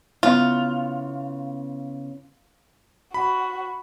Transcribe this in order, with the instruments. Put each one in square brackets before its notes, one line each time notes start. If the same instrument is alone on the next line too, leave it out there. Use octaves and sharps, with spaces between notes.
[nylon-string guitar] C#3 B3 E4 [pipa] F4
[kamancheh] F#4 [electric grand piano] B5